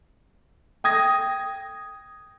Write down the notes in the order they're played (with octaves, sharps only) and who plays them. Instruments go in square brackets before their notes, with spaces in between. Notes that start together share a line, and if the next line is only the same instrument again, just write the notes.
[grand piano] G5 D#6 G#6 A#6